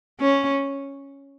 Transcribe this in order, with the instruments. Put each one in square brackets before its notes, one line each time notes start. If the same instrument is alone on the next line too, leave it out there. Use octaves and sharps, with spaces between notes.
[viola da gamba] C#4